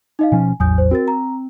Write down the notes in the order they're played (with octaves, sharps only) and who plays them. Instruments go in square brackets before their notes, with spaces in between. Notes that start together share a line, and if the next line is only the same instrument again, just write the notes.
[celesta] D#4 D#5 F5
[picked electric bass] B2 F3 C#4 [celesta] G#5
[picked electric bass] A1 E2 F#3 [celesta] G#5 D#6 G6
[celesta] C5
[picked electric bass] C4 [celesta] F#4 A#4 A6
[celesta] A#5